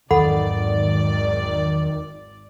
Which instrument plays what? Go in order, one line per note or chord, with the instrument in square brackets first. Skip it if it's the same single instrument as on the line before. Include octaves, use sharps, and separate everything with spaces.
[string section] G#1 D5 [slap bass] E2 F#3 [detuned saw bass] D#3 [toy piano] A4 F#5 B5